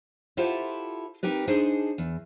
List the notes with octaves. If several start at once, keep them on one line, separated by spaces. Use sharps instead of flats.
E4 F4 G4 A4 C5 F#5
C4 D#4 G4 A#4 B4
D4 D#4 G#4 C5
E2